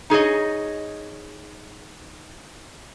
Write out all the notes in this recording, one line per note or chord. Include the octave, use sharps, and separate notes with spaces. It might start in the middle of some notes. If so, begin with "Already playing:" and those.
D#4 G#4 C#5 D#5